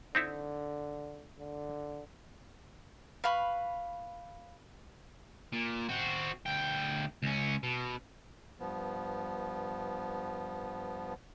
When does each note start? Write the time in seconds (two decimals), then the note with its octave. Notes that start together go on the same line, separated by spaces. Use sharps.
0.15 D3 C4 D#4 E4
1.40 D3
3.24 B4 F5 B5 C#6
5.53 A#2
5.89 C4 F#4
6.46 D2 G5
7.23 C#2 C#4
7.63 B2
8.60 G2 F3 B3